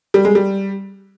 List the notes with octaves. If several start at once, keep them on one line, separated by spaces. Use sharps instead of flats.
G3
G#3
G3